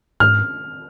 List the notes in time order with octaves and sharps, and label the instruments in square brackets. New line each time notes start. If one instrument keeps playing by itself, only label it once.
[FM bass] G#2 [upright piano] F6